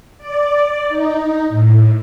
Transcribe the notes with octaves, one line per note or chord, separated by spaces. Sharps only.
D5
D#4
A2